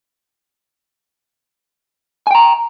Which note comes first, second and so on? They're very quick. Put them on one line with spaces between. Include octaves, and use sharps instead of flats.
G#5 G5 A#5